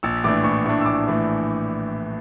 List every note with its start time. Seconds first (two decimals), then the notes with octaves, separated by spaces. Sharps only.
0.03 A#1 E6
0.24 A2 E3 A3 D4 D6
0.44 A#1 C#6
0.65 A2 E3 A3 D4 C#6
0.81 E6
0.86 A#1 D6
1.07 A2 E3 A3 D4